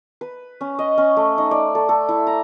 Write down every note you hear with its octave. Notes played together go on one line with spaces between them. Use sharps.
B4
C#4
D#5
C#4
A3
D#4
D5
A4
A4
E4
A#5